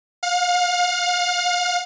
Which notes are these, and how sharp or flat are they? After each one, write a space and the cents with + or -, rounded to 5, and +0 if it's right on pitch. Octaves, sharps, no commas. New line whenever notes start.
F5 +35